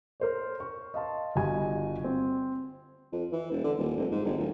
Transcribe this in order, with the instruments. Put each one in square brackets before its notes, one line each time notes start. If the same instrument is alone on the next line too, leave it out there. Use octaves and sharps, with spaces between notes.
[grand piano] A#4 C5 C#5
C#6
D#5 F5 A5 C6
G1 G2 F#4 D#5 G#5
C4
[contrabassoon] F2
E3
E1
D3
D#1
F1
G#2
G1
D1